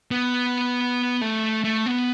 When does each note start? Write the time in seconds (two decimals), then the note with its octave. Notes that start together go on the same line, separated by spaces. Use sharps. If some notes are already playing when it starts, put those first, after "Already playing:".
0.11 B3
1.21 A3
1.64 A3
1.86 B3